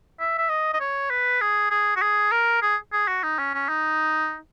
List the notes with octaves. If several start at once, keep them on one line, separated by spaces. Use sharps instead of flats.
E5
E5
D#5
D#5
C#5
B4
G#4
G#4
F#4
G#4
A#4
G#4
G#4
F#4
D#4
C#4
C#4
D#4